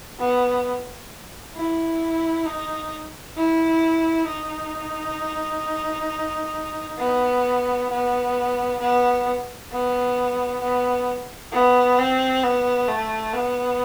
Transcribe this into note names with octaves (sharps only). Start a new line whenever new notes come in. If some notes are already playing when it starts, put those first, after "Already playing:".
B3
E4
D#4
E4
D#4
B3
B3
B3
B3
B3
B3
C4
B3
A3
B3